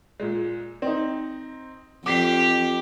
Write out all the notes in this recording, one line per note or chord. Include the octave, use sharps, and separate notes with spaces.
A#2 G#3
C4 D#4
F2 G4 D6 B6 C7